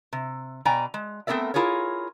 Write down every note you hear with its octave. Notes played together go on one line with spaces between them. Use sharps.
C3
B2 D5 G5 G#5 A#5
G#3
A3 B3 C4 A#4 D5 E5
E4 F4 G#4 A#4 C#5